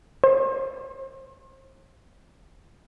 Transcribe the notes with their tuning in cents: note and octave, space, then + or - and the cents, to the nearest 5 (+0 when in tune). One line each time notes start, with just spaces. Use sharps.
C5 +40